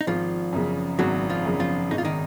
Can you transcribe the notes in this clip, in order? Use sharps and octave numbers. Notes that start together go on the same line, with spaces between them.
D#4
G#1 F3 F4
F#2 C#3
G#1 F#3 F#4
F3 F4
F#2 C#3
F3 F4
G#1 D#4
F4
D#3 D#4